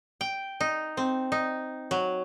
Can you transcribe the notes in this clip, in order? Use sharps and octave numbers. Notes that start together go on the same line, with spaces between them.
G5
D#4
C4
D#4
F#3